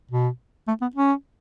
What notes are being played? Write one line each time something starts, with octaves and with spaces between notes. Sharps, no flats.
B2
A3
B3
C#4